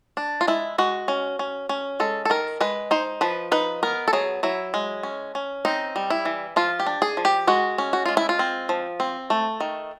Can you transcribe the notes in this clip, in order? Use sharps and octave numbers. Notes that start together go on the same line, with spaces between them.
D4
F4
G#3 E4
G#3 F#4
C#4
C#4
C#4
G#3 A4
A4
D#3 A#4
G#3 B4
D#4 C5
F3 B4
D#4 B4
B3 A#4
A4
F#3 G#4
F#3 E4
G#3
C#4
C#4
C4 D#4
G3
E4
E3
F3 F4
G4
D4
G#4
F3
G4
G#3 F#4
C#4
F#4
G#3 F4
E4
F4
C4
F3
C4
A3
D#3